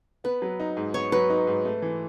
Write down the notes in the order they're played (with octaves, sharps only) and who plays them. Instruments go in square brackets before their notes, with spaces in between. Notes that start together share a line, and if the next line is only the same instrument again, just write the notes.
[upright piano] B3 [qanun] B4
[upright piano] F#3
D#4
G#2
[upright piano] B3 [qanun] C#5
[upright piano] F#3 [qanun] B4
[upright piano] D#4
G#2
A3
E3